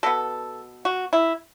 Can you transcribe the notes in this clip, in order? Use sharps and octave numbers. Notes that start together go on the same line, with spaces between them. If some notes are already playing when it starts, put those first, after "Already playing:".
B2 B3 A4
F#4
E4